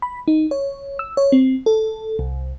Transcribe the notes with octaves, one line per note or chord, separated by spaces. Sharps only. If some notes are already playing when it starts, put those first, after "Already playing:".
B5
D#4
C#5
E6
C#5
C4
A4
C2